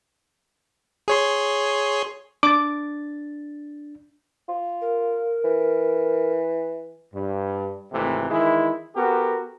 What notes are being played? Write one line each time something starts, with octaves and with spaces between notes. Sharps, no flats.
G#4 C#5 C6
D4 D6 A6
F4
A#4
E3
G2
G#1 G#2 C3 E3 A3
D#3 E3 G#3 E4
B3 F#4 G4 A4 A#4